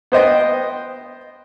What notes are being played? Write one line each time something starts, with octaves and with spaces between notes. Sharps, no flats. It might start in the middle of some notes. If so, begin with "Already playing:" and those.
B3 C5 D#5 G5